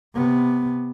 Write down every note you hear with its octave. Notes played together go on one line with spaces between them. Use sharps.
C3 B3